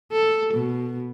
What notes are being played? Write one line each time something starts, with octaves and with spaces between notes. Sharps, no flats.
A4
B2